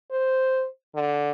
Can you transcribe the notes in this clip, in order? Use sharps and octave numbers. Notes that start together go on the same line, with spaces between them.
C5
D3